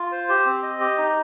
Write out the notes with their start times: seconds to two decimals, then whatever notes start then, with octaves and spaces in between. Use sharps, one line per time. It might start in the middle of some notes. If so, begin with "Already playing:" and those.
Already playing: F4
0.12 C5
0.29 G4
0.46 C4
0.63 D#5
0.80 G4
0.98 D#4